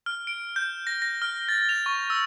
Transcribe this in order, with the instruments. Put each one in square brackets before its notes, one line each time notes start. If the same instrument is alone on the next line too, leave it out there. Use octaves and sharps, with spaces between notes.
[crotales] F6
D7
G6
A#6
A#6
F6
A6
F7
C#6
E6